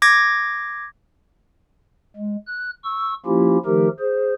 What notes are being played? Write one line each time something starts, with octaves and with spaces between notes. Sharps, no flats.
D6 G#6 A#6
G#3
F#6
C#6 E6
F3 A#3 C#4 E4 F4 G4
D#3 F3 A3 D#4 G4 A#4
G#4 C5